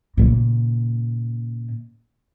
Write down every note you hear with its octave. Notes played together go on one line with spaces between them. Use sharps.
A#2 C#3